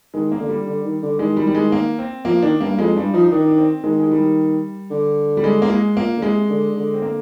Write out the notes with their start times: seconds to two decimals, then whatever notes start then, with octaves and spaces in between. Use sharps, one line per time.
0.14 D#3 G#3
0.32 A#3
0.40 D3
0.49 G3
0.66 D3
0.84 D#3
1.02 D3
1.19 D#3 G#3
1.37 G3
1.47 G3
1.55 G#3
1.72 A#3
1.99 C4
2.25 F3 A#3
2.42 D#3 D4
2.61 G2 A#3
2.78 F2 G#3
2.96 G2 G3
3.13 F3 D#4
3.24 D#4
3.32 D#3 D4
3.47 D4
3.58 C4
3.84 D#3 G#3
4.00 G#3
4.11 G3
4.90 D3
5.37 G3
5.44 G#3
5.62 A#3
5.70 G#3
5.96 A#2 A#3
6.17 D3
6.22 C3 G#3
6.50 D3
6.76 D3
6.94 C4
7.02 A#3